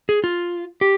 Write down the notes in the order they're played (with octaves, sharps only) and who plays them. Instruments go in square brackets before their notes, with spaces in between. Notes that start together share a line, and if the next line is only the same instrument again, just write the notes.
[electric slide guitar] G#4
F4
G4